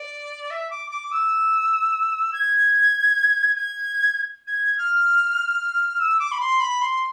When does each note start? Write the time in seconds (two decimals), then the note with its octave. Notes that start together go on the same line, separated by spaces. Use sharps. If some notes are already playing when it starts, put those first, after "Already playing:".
Already playing: D5
0.50 E5
0.70 D6
0.90 D6
1.11 E6
2.32 G#6
3.55 G#6
4.47 G#6
4.77 F6
5.99 E6
6.19 D6
6.31 B5
6.39 C6
6.59 B5
6.81 C6